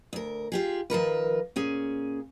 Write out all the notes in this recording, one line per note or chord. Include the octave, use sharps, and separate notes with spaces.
D2 A#4
F4 G4 G#4
D#3 F3 A#4 B4
A#2 C#4 G#4